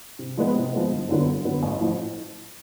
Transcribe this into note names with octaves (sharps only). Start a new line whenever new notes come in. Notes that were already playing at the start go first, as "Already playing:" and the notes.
C3
F3 G#3 B3
C3
F3 G#3 B3
G1
F#2 D3 F#3 B3
G1
F#2 D3 F#3 B3
A1
A2 F3